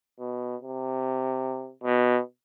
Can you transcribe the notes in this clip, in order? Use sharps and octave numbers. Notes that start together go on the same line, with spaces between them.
B2
C3
B2